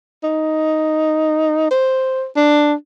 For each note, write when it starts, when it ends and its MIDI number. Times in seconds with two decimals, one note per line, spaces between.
0.24 1.71 63
1.71 2.25 72
2.36 2.74 62